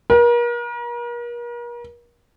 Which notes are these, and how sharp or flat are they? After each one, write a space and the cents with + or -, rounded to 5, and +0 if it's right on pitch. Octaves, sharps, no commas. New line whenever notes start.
A#4 +40